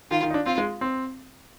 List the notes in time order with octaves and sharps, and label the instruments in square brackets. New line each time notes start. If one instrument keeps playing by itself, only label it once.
[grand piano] D#3 [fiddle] F4
[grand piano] D#3
D#4
D4
[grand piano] C4 [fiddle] F4
[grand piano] G#3
C4